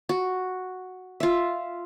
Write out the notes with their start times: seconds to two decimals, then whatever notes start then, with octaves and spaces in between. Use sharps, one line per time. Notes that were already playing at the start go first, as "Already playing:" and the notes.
0.09 F#4
1.20 F4 E5